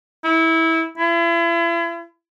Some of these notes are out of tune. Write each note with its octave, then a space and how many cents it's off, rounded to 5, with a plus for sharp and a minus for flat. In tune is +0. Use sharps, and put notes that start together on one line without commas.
E4 -20
E4 +40